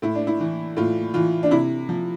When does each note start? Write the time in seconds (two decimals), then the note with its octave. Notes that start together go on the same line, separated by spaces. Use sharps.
0.02 A2 E4
0.15 D4
0.27 E4
0.40 E3
0.77 A2 F4
1.14 E3 F4
1.43 D4
1.51 C3 E4
1.89 F3